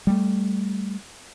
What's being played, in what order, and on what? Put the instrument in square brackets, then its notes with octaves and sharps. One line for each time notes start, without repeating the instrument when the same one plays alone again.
[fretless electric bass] G3 A3